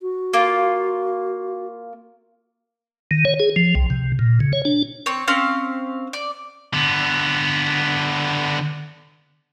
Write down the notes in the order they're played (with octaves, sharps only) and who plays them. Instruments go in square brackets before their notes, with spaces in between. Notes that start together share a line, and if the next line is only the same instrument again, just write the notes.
[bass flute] F#4
[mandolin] A#3 F4
[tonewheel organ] D#3
C#5
G#4
F3
C2
C3
A#2
C#3
C#5
D4
[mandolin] C4 C#5
C4 C#4 F5
D5
[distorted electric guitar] D3 B3